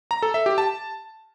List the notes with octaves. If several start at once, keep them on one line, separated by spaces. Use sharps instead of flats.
A#5
A4
E5
G4
A5